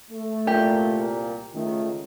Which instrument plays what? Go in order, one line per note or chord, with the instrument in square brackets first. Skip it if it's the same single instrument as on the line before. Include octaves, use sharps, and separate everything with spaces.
[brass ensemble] A3
[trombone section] C2 A#2 [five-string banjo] G4
[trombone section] C#2 [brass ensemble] D#3 A3